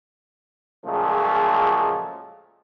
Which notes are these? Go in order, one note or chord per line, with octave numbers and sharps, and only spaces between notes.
A#2 C#3 F3 F#3 G#3 A3